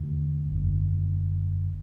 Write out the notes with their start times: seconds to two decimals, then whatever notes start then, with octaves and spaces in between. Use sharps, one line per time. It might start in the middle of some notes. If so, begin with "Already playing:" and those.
Already playing: E2 D3 A3
0.49 F#1 E2 D3